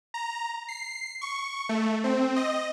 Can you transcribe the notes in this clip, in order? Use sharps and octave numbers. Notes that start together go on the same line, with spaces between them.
A#5
C7
C#6
A3
C4
D#5